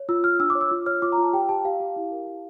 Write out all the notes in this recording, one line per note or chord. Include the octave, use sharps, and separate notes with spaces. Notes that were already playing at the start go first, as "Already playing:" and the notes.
Already playing: C#5
F4 E6
F4 F6
D4 E6
D6
C#5
E6
F4
C#5 F6
F4 D6
A#5
F4
A5
G4 G5
G4 A5
G4 F5
G4
E4
A#4
G4